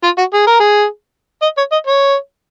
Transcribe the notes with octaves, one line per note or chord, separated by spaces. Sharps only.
F4
F#4
G#4
A#4
G#4
D#5
C#5
D#5
C#5